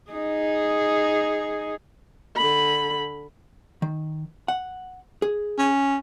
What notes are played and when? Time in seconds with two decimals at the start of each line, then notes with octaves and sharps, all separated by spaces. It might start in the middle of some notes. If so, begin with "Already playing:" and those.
0.11 D#4 G#4
2.36 D3 B5
3.82 D#3
4.48 F#5
5.22 G#4
5.58 C#4